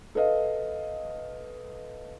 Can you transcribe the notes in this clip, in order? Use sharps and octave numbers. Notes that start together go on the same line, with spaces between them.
A4 B4 D#5 F5